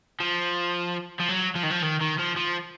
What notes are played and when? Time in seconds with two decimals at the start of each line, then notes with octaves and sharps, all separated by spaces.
0.20 F3
1.19 F3
1.28 F#3
1.56 F3
1.63 D#3
1.70 F3
1.83 D#3
2.01 D#3
2.19 F3
2.37 F3